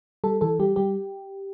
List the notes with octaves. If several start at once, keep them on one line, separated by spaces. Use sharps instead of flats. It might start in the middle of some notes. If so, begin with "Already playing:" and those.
G3 A4
E3 A4
G3 G4
G3 G4